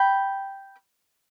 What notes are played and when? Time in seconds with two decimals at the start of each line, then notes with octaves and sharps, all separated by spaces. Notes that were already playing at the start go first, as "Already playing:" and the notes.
Already playing: G5 B5